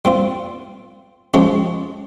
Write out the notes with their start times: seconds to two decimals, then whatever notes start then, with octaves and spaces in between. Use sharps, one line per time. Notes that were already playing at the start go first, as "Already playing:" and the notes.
0.05 G3 C4 F4
1.34 F3 G#3 C#4 G4